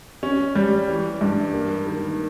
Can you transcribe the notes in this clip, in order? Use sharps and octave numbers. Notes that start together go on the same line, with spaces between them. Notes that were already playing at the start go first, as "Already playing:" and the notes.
C#4
G3
E3
G2
A#3
D#3